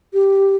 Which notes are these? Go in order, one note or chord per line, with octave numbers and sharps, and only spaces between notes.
G4